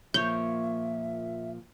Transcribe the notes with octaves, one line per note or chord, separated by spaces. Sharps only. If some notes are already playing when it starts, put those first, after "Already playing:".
A#2 F3 A#3 C#5 E5 G6